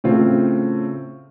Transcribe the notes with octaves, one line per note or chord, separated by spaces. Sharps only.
A2 C#3 C4 F4